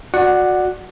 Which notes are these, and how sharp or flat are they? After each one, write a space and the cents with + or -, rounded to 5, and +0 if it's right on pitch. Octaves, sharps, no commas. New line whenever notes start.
F#4 -25 D5 +10 F#5 +0